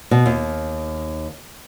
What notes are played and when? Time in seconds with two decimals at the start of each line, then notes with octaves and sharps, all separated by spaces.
0.11 B2
0.26 D#2